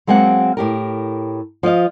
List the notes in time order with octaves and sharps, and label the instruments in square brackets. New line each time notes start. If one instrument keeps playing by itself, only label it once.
[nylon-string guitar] F#3 G#3 A#3 C4 F#5
A2 G4 A#4
F3 F4 D#5 F5